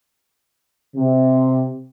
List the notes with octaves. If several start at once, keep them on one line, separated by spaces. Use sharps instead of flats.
C3